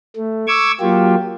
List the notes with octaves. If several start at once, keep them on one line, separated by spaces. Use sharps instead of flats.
A3
C#6 D6 E6 G#6
F#3 A#3 F4 G4